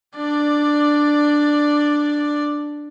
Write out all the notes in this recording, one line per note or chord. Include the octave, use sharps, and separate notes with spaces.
D4 D5